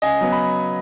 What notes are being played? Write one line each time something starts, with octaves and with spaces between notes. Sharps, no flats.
C#3 D#5 G#5
F#3 B3
B5